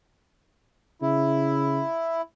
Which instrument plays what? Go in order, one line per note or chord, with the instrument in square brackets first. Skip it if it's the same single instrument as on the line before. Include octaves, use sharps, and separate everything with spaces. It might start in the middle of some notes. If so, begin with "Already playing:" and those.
[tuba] C#3 [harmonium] E4